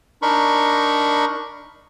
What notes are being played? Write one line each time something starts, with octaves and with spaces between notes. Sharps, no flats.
D4 D#4 A#4 B5 C#6